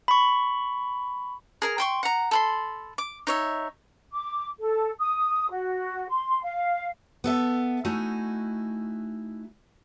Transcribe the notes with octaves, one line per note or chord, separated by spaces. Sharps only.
B5 C#6
G#4 A#4 A#5
G5 C6 C#6
F#5 A#5
A4 B5 C6
D6
D#4 C#5 E5
D6
A4
D#6
F#4
C6
F5
B3 A4 E5
A3 D#4 E4 F#4 G#5